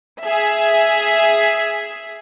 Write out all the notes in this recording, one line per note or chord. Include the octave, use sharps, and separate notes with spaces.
G#4 E5